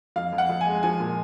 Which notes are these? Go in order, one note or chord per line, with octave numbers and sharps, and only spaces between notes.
F2 F5
F2
F#5
F2
G#5
G#3
F3 G#5
A#2